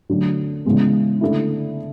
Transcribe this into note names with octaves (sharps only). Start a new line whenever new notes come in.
D3 F#3 A3 D4
C#3 E3 G#3 B3
D3 A3 E4